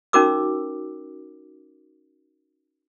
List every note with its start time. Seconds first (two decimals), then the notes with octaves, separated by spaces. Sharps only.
0.13 C#4 D#4 F#4 A#4 D6 E6